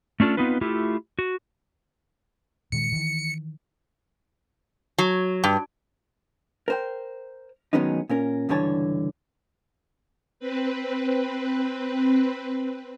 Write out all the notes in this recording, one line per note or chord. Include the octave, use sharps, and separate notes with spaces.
A3 C#4 D4 F4 A4
B3 C4 D#4 F4 B4
A3 E4 F4 G4
F#4
A#2 D#3 G#3 C#7
D#3 E3
F#3
G2
A#4 C5 G5
D#3 F#3 G#3 B3 C#4 D#4
A#2 C#4 A#4
C#2 G2 D3 E3 C#5 A5
C4 B4